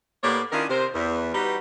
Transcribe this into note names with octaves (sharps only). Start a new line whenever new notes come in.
A2 A#3 B3 G4 C#5 D5
D#3 C#4 D4 E4 F4 A#4
C3 A#4 C5
E2
G3 D#4 F#4 G4 B4